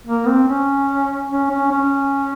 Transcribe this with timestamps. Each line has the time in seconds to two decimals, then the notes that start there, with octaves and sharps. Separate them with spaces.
0.07 A#3
0.27 C4
0.48 C#4
1.30 C#4
1.51 C#4
1.71 C#4